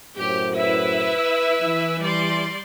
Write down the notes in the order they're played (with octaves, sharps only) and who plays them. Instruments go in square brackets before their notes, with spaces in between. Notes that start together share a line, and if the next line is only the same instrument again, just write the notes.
[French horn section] F#2 A2 C5 [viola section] G4
[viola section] E4 B4 E5
[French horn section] E3
[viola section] G3 D5 C6